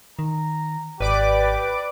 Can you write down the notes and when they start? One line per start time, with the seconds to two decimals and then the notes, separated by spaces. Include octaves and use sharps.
0.19 D#3 A#5
1.00 G#1 G4 B4 D5 D6